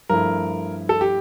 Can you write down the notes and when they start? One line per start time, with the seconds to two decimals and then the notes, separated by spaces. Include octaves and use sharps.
0.09 G2 F3 A3 E4 A#4
0.89 A4
1.01 G4